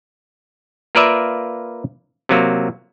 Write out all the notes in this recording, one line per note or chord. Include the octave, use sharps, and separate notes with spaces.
A#3 F4 A#4 B4 D5 E5
C3 F#3 A#3